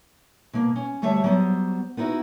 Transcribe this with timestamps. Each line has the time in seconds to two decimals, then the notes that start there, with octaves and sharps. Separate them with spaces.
0.53 B2 A#3
0.76 C#4
1.02 D2 G3 A3 C#5 E5 A5
1.24 F#3 G3 B3 C5
1.97 B3 D#4 E4 F#4